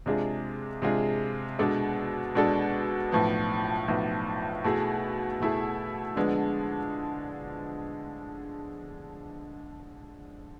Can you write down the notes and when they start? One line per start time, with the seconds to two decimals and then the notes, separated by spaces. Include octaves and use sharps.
0.06 C3 G#3 D4 F4 G#4
0.82 C3 G#3 D4 F4 G#4
1.59 B2 G#3 D4 A4 D5
2.35 B2 G#3 D4 A4 D5
3.11 B1 A2 F3 B3
3.88 B1 A2 F3 B3
4.64 B2 A3 E4 G#4
5.40 B2 A3 E4 G#4
6.16 D3 F3 G#3 B3 D4